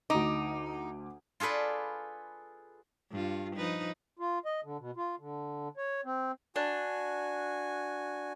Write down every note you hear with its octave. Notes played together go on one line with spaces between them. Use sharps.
D2 D#4 D6
F4 G#4 A4 B4 D5
G2 F4
F3 D#4 B4
F4
D#5
D3
B2
F4
D3
C#5
C4
D4 F#4 G#5